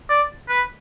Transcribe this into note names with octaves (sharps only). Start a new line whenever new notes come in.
D5
B4